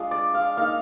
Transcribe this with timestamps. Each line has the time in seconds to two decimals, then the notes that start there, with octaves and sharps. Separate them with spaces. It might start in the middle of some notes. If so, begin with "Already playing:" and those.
Already playing: G#3 D4 F4
0.11 D5
0.34 F5
0.57 A#3 D#4 F5